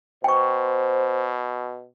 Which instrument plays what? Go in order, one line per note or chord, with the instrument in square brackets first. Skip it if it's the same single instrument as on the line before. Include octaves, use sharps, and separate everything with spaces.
[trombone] B2 [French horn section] C5 [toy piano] G5 C#6